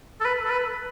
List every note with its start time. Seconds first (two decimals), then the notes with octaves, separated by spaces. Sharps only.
0.21 A4
0.25 B4
0.45 A4
0.50 B4